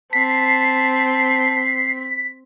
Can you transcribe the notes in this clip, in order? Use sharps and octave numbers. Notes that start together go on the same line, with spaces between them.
C4 A5 B6 C7